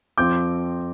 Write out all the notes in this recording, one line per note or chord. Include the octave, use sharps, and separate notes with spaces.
F2 F3 C4 D6 G6